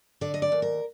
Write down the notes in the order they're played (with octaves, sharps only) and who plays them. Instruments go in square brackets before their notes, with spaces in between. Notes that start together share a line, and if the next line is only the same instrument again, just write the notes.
[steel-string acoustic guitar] D3 D5
D#5
D5
D#2
A#4